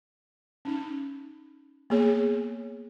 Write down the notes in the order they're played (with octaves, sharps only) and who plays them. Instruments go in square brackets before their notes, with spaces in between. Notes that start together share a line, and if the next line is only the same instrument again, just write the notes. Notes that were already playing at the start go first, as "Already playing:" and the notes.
[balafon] C#4 D#4
A#3 B3 G#4 C#5